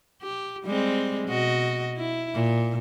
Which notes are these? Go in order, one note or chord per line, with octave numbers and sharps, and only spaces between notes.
G4
G3 G#3 C4
B2 F#4 D#5
E4
A#2